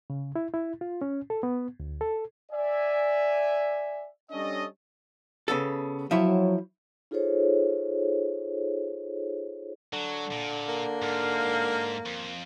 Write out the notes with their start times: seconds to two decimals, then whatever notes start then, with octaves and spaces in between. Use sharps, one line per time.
0.10 C#3
0.36 E4
0.54 E4
0.81 F4
1.02 C#4
1.30 A4
1.43 B3
1.80 D2
2.01 A4
2.52 D5 E5 G#5
4.31 G3 C#4 D4 A4 C#5 D#5
5.48 C#3 B3 A4
6.11 F3 F#3 E4 C#5
7.11 D#4 F4 G#4 A4 C5 C#5
9.93 D3 F#3
10.31 A#2
10.68 A#3
11.02 G#2 F5
12.06 F2